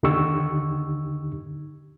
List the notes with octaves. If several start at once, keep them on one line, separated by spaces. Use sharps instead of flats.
D#2 D3 D#4 G4 C#6 E6